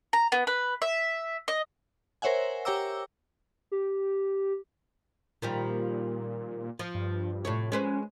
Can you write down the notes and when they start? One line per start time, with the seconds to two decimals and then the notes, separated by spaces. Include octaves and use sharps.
0.13 A#5
0.32 B3
0.47 B4
0.82 E5
1.48 D#5
2.22 A#4 C5 C#5 E5 F#5 G#5
2.65 G4 C#5 G5 A#5 D6 E6
3.72 G4
5.42 A#2 D#3 F3 G3
6.79 F3
6.95 G2
7.45 A2 C3 C#5
7.72 G#3 C#4 B4 C5